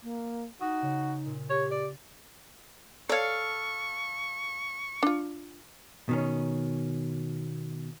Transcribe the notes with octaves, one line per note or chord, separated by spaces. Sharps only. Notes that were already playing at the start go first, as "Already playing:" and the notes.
A#3
D#4 F#4 D#6
C#3
A#2
G4 C#5
D5 A6
A4 C#5 D5 F5 C#6
D4 F4
B2 D#3 C#4